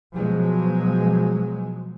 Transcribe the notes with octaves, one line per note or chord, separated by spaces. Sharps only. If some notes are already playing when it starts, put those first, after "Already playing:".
B2 F3 F#3 G#3